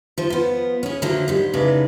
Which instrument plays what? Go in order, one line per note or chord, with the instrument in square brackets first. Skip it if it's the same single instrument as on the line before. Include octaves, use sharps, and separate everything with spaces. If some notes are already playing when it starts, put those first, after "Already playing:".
[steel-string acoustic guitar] F3 C5
F3 B3
C#4 G#4
D3 F3 F#3 A3 A#3
G#2 G3
A2 C#3 D#4 B4 D5